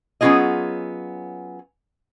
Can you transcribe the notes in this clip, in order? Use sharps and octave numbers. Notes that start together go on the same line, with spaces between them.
F#3 B3 C#4 F4 G#4 D#5